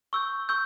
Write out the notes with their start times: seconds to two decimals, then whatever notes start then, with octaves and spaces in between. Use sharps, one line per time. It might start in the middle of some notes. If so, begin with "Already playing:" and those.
0.13 C#6 E6 G6
0.49 C#6 E6 G6